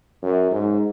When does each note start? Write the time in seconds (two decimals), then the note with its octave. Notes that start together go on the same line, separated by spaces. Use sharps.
0.22 F#2
0.51 G#2